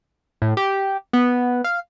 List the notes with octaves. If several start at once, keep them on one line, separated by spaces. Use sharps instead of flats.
A2
G4
B3
F5